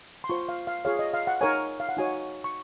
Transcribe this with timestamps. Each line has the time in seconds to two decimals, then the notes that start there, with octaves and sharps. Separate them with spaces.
0.24 C6
0.30 F4 C5 C#6
0.49 F5
0.67 F5
0.85 F4 G#4 C#5 F5
0.99 D#5
1.14 F5
1.27 F#5
1.41 D#4 A#4 C#5 G#5
1.80 F5
1.89 F#5
1.97 D#4 F#4 C#5 G#5
2.44 C#6